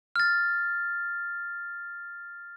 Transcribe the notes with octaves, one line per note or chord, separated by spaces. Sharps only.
F6 A6